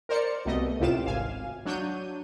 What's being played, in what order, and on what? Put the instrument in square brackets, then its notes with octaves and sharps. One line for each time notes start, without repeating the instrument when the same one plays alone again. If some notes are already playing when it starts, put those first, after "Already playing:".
[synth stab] A#4 C5 D5 C#7
C2 B2 A3 D#5
C#2 A2 C3 F4 D6 E7
G#1 F5 G#5
F#3 D4 C#5 G6 D#7